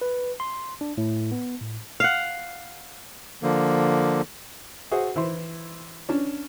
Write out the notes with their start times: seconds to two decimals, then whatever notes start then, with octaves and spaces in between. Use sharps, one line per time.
0.01 B4
0.40 C6
0.81 D4
0.98 A2
1.32 B3
1.62 A2
2.00 F5 F#5
3.43 D3 F3 A#3
4.91 F#4 G#4 C5 E5
5.16 E3 E4 C5 C6
6.09 C#4 D4